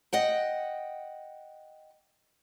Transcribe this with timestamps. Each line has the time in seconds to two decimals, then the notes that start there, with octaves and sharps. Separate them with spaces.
0.13 D#5 F#5 G5